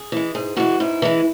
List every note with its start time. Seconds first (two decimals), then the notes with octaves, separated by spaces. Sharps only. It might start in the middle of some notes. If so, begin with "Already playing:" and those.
Already playing: G#4
0.12 E3 G#3
0.35 G#2 G#4
0.57 E3 G#3 F#4
0.80 G#2 E4
1.02 E3 G#3